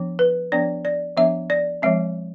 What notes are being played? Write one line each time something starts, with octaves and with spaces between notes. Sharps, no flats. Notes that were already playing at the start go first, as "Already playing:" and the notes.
Already playing: F3 B3 D4
B4
F3 B3 D4 D5
D5
F3 B3 D4 E5
D5
F3 G#3 C4 E5